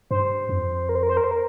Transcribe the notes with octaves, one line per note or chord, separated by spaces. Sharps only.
G2 C5
F2
A#4
C5
A#4
C5
A#4
C5
A#4